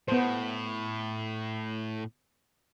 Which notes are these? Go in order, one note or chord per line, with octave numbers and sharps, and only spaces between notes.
A2 B3 C5